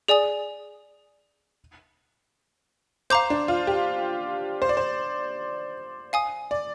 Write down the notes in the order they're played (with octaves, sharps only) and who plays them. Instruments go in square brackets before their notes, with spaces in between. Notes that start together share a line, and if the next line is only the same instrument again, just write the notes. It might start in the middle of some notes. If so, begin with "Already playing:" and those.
[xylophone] G#4 D5 G#5 D#6
[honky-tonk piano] C5 [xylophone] F5 A#5 D6 G6
[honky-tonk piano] D4
F4
G4
C5
D5
C5
[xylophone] F5 G#5 D#6
[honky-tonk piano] D5